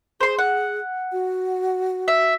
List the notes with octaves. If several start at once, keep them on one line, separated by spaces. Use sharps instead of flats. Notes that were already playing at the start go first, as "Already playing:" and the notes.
G#4 C5 C6
F#5
F#4
E5